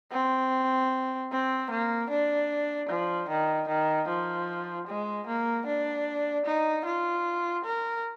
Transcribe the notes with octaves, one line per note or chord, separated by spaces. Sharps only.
C4
C4
A#3
D4
F3
D#3
D#3
F3
G#3
A#3
D4
D#4
F4
A#4